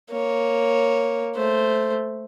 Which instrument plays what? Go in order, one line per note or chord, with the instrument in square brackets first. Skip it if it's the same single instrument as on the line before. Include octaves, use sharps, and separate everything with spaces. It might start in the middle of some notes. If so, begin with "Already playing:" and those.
[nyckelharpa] A#3 [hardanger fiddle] C#5
[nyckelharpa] A3 [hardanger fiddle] C5